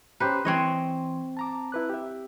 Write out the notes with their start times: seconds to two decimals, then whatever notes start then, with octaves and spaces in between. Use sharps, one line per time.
0.20 C#4 G4 B4 C5 A#5
0.45 E3 C4 C#5 D#5 C6
1.37 A5 A#5 D6
1.72 E4 B4 F#6
1.90 G4 E5